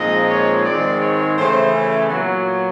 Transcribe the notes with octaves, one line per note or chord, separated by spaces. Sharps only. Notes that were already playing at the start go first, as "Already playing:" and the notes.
Already playing: A#2 F3 G#3 C4 D#4 D#5
C#5
G#2 D#3 G#3 C4 D5
C#5
C#3 E3 A3 C#4 C5
G#4
A#2 F#3 B3 F#4